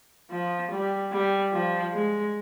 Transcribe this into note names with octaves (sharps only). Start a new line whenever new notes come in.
F3
G3
G3
F3
G#3